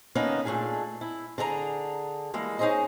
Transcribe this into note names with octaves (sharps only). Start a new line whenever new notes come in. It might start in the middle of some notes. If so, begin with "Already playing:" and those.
D3 A#3 B3 C#4 D#4
A#2 A3 D4 G#4 G#5
E4
D3 G#4 D5 A#5
E3 G3 G#3 A#3
C#4 D#4 F4 G#4 C5 D#5